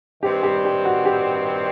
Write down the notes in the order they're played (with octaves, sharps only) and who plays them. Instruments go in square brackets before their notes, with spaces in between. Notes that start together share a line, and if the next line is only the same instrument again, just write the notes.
[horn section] G2 D#3 G3 C4 [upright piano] G4
[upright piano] G4
G4
F#4
G4